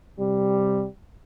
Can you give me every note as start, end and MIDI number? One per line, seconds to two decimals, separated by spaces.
0.19 0.86 48
0.19 0.86 55